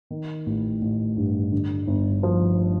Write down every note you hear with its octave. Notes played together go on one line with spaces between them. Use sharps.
D#3
A1
A1
G2
D3
G1
F3